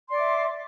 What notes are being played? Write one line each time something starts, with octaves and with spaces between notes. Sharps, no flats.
D5 E5 C6 D6